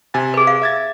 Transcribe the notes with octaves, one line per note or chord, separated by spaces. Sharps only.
C3 G#5 A6
G#4 B4
F5
E5 G#6 A6